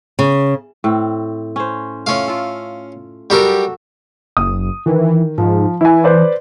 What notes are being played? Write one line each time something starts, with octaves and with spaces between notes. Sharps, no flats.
C#3
A2 C4
C#4 C5
A3 C#4 F4 F5
F4 A4
F#3 G3 F#4 G4 A4 A#4
F#1 D#6
D#3 E3
G#2 F3
E3 E4 G#5
B4 C5 D5